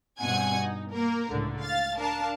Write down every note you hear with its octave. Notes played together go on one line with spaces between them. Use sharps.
G2 B2 C4 F#5 G#5 G#6
D#4
A#3 A#4
C#2 A2 D3
F5 A6
D4 A#4 F5 A5